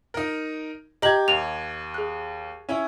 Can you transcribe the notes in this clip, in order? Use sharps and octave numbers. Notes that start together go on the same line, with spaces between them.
D#4 A#4
G4 D#5 A#5 G#6 F#7
D#2 F7
G#4 F#6
C#4 E4 C#5